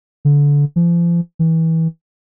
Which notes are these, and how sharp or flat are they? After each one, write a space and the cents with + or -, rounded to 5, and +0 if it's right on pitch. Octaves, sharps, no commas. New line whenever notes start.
D3 -25
F3 -35
E3 -25